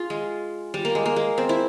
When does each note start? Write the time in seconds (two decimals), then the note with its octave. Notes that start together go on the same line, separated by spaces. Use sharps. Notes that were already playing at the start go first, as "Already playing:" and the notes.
Already playing: F4 G#4
0.10 G#3
0.74 G3
0.85 A#3
0.95 G#3
1.06 A#3
1.16 G#3
1.38 C4
1.49 E4